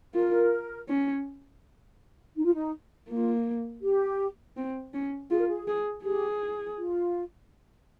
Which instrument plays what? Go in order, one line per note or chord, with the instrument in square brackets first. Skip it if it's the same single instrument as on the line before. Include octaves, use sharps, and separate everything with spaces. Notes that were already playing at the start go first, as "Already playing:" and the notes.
[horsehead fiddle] F4 [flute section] A#4
[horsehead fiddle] C#4
[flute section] D#4
F4
D#4
[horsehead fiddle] A#3 [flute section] F4
[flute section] G4
[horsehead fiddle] C4
C#4
[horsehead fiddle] F4 [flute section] G#4
[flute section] A#4
G#4
[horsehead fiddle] G#4
[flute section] G4 [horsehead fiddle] G#4
[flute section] F4